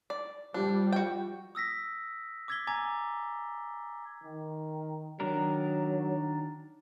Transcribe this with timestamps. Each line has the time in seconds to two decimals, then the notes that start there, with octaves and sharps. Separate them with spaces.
0.10 D5
0.54 F3 G3 D4
0.93 F#4 G5
1.55 D#6 E6 A#6 B6
2.48 D6 E6 G#6 A6 B6 G7
2.67 G#5 A#5 D6 G#6 A6
4.24 D#3
5.20 D#3 F#3 D4 A#4